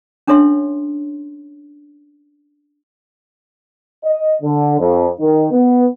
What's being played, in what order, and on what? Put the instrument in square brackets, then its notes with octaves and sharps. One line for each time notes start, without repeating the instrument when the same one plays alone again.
[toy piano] C#4 D4 A4 C#5 E5 C6
[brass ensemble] D#5
D3
F2
D#3
B3